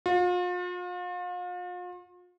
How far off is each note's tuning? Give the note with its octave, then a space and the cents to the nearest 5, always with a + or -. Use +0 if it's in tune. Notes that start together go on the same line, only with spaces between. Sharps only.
F4 +40